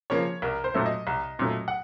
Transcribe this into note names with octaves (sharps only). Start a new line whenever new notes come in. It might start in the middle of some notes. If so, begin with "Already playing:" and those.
C#3 F3 A#3 C#5
C2 A#4
C5
A#2 F#3 A3
D#5
C2
A#2 F#3 A3
F#5